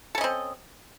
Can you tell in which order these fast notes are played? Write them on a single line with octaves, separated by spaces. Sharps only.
A4 C#4 D#5 C4